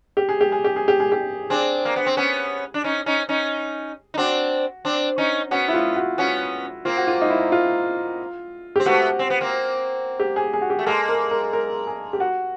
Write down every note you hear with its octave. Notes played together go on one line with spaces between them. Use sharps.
G4
G#4
G4
G#4
G4
G#4
G4
G#4
G4
C4 D4 G#4
A#3
B3
C4
B3 C#4
D4
C#4 D#4
C#4 D#4
C#4 D#4
D#4
C4 D4 F#4
C4 D4
C#4 D#4
B3 C#4 F#4
E4
F4
F#4
B3 C#4 F#4
A#3 C4 F4
F#4
F4
D#4
E4
F4
C4 G4
A3 B3 F#4
C4
B3
A#3 C4
G4
G#4
G#4
F#4
G4
A3
G#3 A#3 A4
A#4
A#4
A#4
G#4
G4
F#4